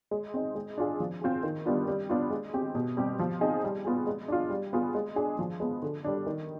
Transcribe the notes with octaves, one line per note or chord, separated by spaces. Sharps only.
G#3
C4 D#4
G#3
D4 F4 G#4
F3
C4 F4 G#4
D#3
G3 B3 D4 F4
G3
B3 D4 F4
G#3
C4 G4
B2
G3 C4 G4
F3
C4 D#4 G#4
G3
B3 F4 G#4
G#3
D4 F4
G3
B3 F4 G#4
G#3
D4 G#4
F3
G#3 B3
D3
G3 D4
D#3